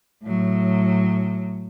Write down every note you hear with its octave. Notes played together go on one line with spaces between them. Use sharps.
A2 F#3